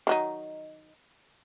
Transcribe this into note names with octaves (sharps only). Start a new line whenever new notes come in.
D#3 F#3 D#4